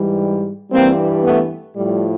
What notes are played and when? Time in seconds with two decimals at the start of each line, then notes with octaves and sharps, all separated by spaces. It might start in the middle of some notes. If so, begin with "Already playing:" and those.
Already playing: G#2 E3 G3
0.71 G2 E3 G3 A#3 C4
1.24 A3 B3
1.76 A2 F3 G3